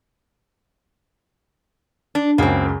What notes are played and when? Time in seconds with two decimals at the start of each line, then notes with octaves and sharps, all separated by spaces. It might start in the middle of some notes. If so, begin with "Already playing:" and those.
2.15 D4
2.38 C#2 F#2 C#3 A#3 C4